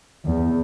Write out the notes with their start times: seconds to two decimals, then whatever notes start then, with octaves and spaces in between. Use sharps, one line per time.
0.25 E2